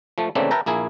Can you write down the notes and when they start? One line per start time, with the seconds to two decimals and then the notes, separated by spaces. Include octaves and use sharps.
0.18 F3 A3
0.35 C#3 E3 A3 A#3 C4 D4
0.51 A#4 B4 E5 G5 A5 A#5
0.66 A#1 A#3 E4 G#4